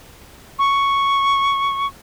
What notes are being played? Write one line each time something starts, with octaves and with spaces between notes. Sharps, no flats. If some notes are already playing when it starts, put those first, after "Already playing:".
C#6